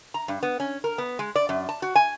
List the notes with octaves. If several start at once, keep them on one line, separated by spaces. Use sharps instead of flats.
A#5
G2
B3
C#4
A#4
B3
G#3
D5
F#2
A5
F#4
G#5